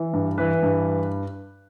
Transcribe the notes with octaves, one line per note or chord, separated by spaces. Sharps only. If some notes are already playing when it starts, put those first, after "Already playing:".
Already playing: E3
G2
E3 B4
G2